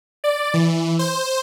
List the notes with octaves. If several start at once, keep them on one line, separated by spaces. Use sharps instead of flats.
D5
E3
C5